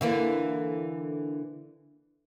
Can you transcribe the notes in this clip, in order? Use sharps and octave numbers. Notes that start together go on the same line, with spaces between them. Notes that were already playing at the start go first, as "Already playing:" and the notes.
D3 E3 A#3